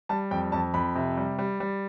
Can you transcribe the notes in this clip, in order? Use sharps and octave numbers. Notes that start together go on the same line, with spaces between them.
G3 A5
F2 G5
F2 A5
F2 B5
C3
G3
G3
G3